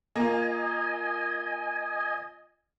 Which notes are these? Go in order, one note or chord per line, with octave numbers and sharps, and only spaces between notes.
A#3 F4 D#5 G#5